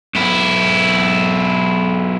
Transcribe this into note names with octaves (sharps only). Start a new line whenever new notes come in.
B1 E4